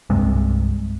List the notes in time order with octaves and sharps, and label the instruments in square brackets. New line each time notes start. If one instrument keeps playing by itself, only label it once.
[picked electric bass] C2 G2 C3 G#3